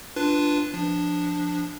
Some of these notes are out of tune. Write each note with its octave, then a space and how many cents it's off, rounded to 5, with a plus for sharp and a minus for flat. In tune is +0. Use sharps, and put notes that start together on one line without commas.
D4 +0 F4 -10 B4 +0
F3 +0 D4 +0